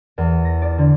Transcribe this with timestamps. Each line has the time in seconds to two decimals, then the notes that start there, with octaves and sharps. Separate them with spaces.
0.18 E2
0.45 A#6
0.62 D5
0.78 D3